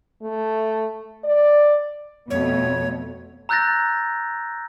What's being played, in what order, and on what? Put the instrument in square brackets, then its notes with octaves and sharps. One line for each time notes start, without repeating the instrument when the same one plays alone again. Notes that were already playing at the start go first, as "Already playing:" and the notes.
[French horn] A3
D5
[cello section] F2 B2 A3 [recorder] C#5
[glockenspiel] A#5 E6 F#6 G6 A6 A#6